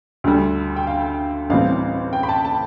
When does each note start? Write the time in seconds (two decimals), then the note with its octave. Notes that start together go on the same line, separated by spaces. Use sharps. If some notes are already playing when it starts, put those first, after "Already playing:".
0.24 D2 D3 G3
0.76 G5
0.87 F5
1.50 A1 A2 G3 C4 F5
2.13 G5
2.23 B5
2.29 A5
2.45 A5